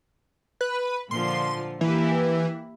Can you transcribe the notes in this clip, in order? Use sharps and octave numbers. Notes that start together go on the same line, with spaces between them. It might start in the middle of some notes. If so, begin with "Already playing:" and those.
B4
A#2 D3 F3 C6
E3 A#3 E4 G4